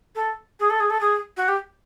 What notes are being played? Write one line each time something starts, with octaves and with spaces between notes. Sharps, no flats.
A4
G#4
A4
G#4
A4
G#4
F#4
G4